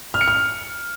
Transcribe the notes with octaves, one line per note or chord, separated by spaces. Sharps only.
F6
C#7
F6